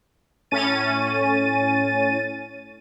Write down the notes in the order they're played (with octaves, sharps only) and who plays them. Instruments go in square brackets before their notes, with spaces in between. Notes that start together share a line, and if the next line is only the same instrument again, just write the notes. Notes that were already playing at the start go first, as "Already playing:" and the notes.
[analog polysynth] A2 C#4 A6 D#7